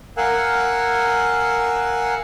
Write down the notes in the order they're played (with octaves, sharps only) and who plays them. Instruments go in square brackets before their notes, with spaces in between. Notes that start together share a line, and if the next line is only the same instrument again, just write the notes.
[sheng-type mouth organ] A#4 F5 F#5 G#5 E6 F#6